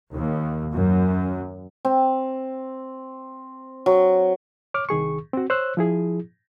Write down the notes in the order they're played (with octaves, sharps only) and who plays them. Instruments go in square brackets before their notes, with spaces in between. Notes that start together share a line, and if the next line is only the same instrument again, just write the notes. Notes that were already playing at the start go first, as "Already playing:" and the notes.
[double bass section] D#2
F#2
[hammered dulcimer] C4
F#3
[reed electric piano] C#5 D6 F6
C2 D#3 G#4 C#6
C4 F#4
C5 C#5 E6 F#6
F3 E4 G#4